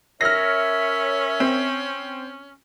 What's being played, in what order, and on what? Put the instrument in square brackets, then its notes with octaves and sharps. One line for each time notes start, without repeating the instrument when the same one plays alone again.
[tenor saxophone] C#4 [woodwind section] A#4 C#5 E5 [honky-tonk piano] F6 A#6
[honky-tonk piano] C4